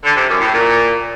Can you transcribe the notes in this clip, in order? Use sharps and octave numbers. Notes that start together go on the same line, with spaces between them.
D3
C3
F#2
A2
A#2